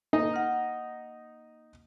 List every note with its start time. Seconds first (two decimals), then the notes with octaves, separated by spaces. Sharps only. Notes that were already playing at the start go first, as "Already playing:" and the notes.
0.13 A#3 D#4 D#5
0.33 F#5 F6